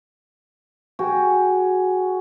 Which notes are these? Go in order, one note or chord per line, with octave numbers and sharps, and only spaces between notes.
F#4 G#4 G5